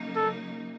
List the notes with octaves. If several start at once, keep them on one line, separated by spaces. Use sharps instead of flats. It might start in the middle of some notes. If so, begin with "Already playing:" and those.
Already playing: C#3 F#3 A#3 D#4
A4